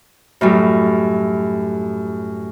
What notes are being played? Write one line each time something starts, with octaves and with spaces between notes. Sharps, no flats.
F#2 A2 G3